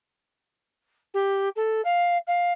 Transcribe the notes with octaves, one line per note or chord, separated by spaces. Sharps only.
G4
A4
F5
F5